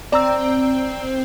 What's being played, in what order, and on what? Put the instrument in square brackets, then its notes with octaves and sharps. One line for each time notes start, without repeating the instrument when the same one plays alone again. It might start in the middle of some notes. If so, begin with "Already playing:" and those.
[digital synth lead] C4 [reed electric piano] D5 A#5 E6